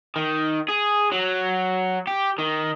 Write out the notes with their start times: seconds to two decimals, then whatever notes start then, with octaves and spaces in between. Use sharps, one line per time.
0.16 D#3
0.68 G#4
1.12 F#3
2.07 G4
2.39 D#3